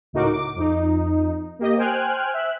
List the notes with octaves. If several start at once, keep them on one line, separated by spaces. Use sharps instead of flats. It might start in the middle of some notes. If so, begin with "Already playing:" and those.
C#2 A2 D#4 F#4 A#4 D6
D6
F2 D#4
A#3 G4 D#5
C5 G5 G#5 F6 F#6
E5 F#6